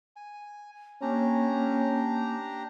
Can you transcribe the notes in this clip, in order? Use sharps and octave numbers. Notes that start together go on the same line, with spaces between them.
G#5
A#3 C#4 D4 G4 A#5